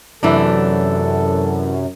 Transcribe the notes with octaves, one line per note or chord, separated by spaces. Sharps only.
F#2 C3 E3 A3 D4 E4 A4 A#5